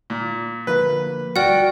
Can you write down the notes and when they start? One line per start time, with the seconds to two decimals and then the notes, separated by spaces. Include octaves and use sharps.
0.10 A#2
0.67 D3 F3 A#3 B4
1.36 D2 G3 F#4 D5 F#5 G5 F6